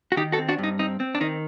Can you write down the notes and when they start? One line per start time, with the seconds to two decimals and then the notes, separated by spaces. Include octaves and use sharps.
0.12 F#4
0.17 D#3 D#4 G4
0.32 F#4 A4
0.38 C4
0.48 D4 F#4
0.58 G2
0.63 D#4
0.79 C4 D#4
1.00 C4
1.15 D4
1.21 D#3 D#4